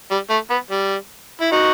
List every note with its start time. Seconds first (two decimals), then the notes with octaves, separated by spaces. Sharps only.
0.11 G3
0.30 A3
0.50 B3
0.71 G3
1.41 E4
1.52 D#4 F#4